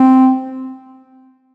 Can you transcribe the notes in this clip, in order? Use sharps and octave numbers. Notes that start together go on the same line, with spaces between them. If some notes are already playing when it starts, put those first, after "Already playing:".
Already playing: C4